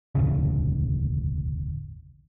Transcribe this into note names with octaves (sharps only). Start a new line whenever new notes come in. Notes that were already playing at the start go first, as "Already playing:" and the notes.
E1 A1 D2 C#3